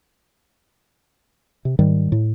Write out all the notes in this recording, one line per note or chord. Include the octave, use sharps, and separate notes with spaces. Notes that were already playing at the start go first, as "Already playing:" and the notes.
C3
G#2 D#3 G3
A2